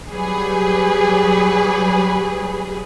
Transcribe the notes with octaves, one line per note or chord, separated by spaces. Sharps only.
F#3 G3 G#4 B4